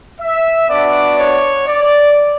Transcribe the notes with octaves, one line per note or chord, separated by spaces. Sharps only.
E5
B3 D4 F#4 D5
C#5
D5